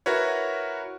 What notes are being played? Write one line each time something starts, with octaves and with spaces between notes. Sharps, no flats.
E4 F#4 A#4 B4 C#5